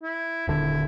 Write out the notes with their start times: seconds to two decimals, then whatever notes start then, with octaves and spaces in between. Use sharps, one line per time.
0.03 E4
0.48 D#1 D3 E4